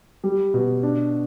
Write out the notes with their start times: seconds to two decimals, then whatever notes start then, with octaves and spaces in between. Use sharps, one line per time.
0.24 G3
0.54 B2
0.83 D4